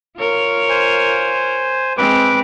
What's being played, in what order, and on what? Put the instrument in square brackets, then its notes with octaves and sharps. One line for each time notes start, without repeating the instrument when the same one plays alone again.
[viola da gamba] F4 A#4 C#5
[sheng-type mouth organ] C5 G#5
[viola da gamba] G#3 C4 [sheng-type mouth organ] B4 D6